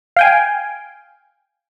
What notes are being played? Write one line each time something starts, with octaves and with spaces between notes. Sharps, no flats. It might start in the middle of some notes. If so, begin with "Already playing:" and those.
F5 G5 G#5